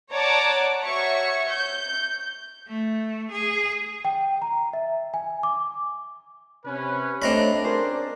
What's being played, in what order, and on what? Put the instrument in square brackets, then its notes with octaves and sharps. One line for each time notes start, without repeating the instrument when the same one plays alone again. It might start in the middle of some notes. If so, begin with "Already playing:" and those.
[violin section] C#5 D5 F#5 A5 A#5 D6
F#4 C#5 E5 C#6
G6
[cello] A3
G#4
[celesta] G5
A#5
E5
G#5
D6
[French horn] C3 [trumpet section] C#4 B4
[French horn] A3 [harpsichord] C4 A#5 B5 [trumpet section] D4 [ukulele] C#5 D#5
[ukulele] C#4 G#4 C5 [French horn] A#4